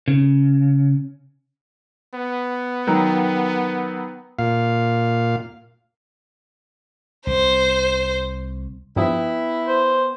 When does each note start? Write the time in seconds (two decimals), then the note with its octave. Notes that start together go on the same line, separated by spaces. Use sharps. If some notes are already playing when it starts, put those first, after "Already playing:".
0.08 C#3
2.14 B3
2.87 D#3 F#3
4.39 A#2 F5
7.27 C2 C5
8.96 G2 F3 B3 E4 G5 D#6
9.68 C5